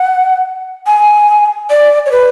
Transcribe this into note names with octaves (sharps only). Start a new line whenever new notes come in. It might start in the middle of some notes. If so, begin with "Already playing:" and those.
Already playing: F#5
G#5
D5
C#5
B4